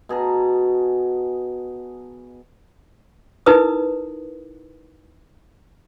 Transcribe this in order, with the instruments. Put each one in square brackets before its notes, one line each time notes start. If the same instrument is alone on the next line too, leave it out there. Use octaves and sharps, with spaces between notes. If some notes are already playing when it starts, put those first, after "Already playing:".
[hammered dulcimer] B2 G#4 A5 A#5
[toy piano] D#4 E4 A#4 B4 D#6